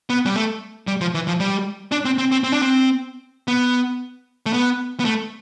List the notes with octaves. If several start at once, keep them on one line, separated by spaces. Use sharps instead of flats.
B3
G3
A3
G3
F3
E3
F3
G3
D4
C4
C4
C4
C4
D4
C4
B3
A3
B3
B3
A3